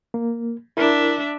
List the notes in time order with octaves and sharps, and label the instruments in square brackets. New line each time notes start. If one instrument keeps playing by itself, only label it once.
[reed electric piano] A#3
[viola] D4 E5 [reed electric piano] E4 A#4